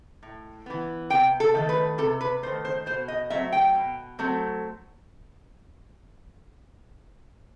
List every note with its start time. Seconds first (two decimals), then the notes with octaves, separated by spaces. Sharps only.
0.23 A2
0.66 E3 B3
1.10 C3 G5
1.40 A4
1.55 D#3 A3
1.69 B4
1.98 C3 A4
2.21 B4
2.43 A3 C5
2.46 D#3
2.65 C5
2.86 B2 C5
3.08 D#5
3.30 F#3 A3 C4 E5
3.52 G5
3.75 B2
4.19 F#3 A3 C4